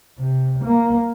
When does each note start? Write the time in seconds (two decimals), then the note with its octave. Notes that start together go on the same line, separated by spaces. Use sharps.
0.18 C3
0.65 A#3